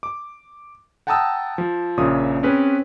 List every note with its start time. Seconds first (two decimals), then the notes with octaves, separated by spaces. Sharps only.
0.03 D6
1.07 F#5 G5 A5 A#5 D#6 E6
1.58 F3
1.97 A#1 A#2 C#3 C#5 D#6
2.43 C4 C#4 G#4 B4